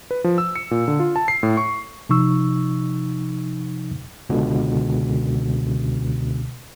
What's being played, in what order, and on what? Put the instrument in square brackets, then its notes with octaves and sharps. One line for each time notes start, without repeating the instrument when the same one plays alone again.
[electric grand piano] B4
F3
E6
C#7
A#2
D3
F4
A5
C7
A2
C#6
[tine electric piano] C3 F3 D#4 C#6 E6
C#2 B2 D3